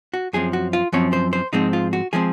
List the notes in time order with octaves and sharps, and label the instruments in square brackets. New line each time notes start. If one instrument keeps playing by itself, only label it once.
[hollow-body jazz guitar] F#4
F#2 F3 C4 G#4
F#4
F4
F#2 F3 C4 C#5
C5
C5
G#2 F3 G#3 C4 D#4
F4
F#4
F3 G#3 C4 G#4